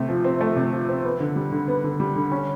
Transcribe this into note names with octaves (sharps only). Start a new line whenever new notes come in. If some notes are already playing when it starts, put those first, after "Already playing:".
Already playing: C3 A3
F3
C4
A3
C3
F3
C4
B3
D3
G3
D3
B3
D3
G3
D3
C#4